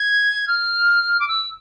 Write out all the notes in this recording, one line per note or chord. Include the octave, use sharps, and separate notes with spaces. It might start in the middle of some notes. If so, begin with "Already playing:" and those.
Already playing: G#6
F6
D6
E6